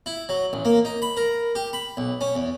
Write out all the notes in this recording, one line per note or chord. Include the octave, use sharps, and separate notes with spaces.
E4
F#3
A1
A#3
D#4
B5
A#4
G4
B5
B1
C#4
E2